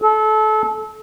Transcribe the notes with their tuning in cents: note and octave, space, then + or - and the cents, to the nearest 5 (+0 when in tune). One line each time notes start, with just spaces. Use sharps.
A4 -25